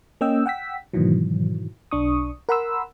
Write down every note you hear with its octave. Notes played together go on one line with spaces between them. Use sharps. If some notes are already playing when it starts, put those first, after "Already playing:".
A#3 C#4 D#5 G5 E6
F#5 G5 E6 B6
G#2 B2 D#3 E3 F#3
B1 D4 C#6 D#6
A#4 F#5 B5 C6 E6